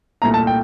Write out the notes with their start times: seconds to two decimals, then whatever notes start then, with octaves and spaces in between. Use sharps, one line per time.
0.22 C2 A#2 A3 A#5
0.34 A5
0.47 G5